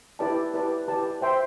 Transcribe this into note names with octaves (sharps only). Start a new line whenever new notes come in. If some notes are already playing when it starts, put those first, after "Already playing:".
E4 G4 B4 D5 A5
E4 G4 B4 D5 A5
E4 G4 B4 D5 A5
C5 E5 G5 C6